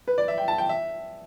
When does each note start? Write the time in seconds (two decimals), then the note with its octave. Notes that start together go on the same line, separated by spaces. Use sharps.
0.08 B4
0.18 D5
0.28 E5
0.38 G5
0.48 A5
0.58 G5
0.69 E5